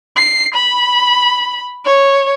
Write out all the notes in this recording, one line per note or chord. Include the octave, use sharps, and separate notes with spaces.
C7
B5
C#5